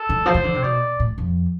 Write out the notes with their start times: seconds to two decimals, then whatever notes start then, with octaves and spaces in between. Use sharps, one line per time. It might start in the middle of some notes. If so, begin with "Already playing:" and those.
Already playing: A4
0.09 D3
0.26 F3 C5
0.34 E3
0.44 D3
0.54 C3
0.63 B2 D5
1.00 A2
1.18 F2